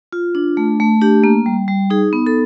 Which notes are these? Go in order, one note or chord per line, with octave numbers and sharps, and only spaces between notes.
F4
D4
A3
A3
D4 G4
A#3
G3
G3
D#4 G#4
B3
A4